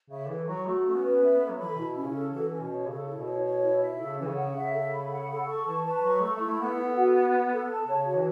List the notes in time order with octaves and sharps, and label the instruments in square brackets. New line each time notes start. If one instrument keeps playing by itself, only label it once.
[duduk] C#3 [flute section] E5
[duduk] E3 [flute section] A4
[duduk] F#3 [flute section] C#6
[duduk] A3 [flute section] F#4
[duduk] A3 [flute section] C#4
[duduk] B3
[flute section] B4
[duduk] B3 [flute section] E5
[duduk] B3
[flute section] A4
[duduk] F#3
[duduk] E3 [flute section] B5
[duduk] B2 [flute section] E4
[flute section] C#4
[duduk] C#3
[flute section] A4
[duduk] E3 [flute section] F#4
[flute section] C#4
[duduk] B2
[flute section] C#5
[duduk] C#3 [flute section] A4
[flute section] E4
[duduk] B2
[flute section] C#5
C#5
E4
E5
[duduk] C#3 [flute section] A4
[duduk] E3 [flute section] C#4
[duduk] C#3
[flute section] F#5
[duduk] C#3 [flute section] E5
[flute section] A4
B5
F#5
A4
C#6
[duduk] E3 [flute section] A5
[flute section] B4
[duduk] F#3 [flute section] C#6
[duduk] A3 [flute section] A4
[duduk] A3 [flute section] E4
[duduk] A3
[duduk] B3 [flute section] F#5
[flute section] A4
F#4
F#5
F#5
A4
A5
[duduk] C#3 [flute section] C#5
[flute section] F#4
[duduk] E3